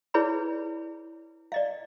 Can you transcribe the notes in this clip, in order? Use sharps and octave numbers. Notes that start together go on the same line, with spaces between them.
E4 G#4 B4 C#5 D5 B5
D5 D#5 F5